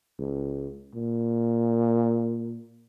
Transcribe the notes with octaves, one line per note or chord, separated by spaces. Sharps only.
C#2
A#2